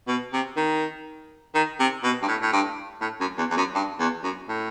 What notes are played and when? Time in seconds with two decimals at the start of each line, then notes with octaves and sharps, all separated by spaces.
0.08 B2
0.33 C3
0.57 D#3
1.55 D#3
1.80 C3
2.03 B2
2.23 G2
2.28 A2
2.42 A2
2.53 G2
3.01 A2
3.20 F#2
3.38 E2
3.50 E2
3.57 F#2
3.75 G2
3.99 E2
4.24 F#2
4.49 A2